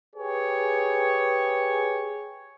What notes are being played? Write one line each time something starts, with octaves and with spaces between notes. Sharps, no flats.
G4 G#4 B4 C#5